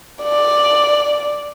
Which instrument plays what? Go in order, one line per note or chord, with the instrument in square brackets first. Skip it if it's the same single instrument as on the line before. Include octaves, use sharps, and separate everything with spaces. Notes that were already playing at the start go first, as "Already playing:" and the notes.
[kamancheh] D5